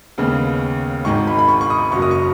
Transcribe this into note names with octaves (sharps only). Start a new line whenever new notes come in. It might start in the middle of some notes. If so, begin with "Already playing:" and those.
D#2 C#3 G#3 B3
G#1 G#2 D#3 G#3 C#6
B5
B5
C#6
C#6
D#6
F#1 F#2 F#3 C#6
D#6
C#6